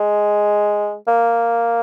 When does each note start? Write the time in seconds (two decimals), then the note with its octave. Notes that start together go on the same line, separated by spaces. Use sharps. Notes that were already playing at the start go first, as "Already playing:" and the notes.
Already playing: G#3
1.07 A#3